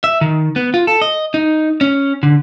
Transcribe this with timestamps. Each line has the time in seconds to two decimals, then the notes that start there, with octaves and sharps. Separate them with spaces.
0.04 E5
0.21 D#3
0.56 B3
0.74 F4
0.87 A4
1.02 D#5
1.34 D#4
1.81 C#4
2.23 D3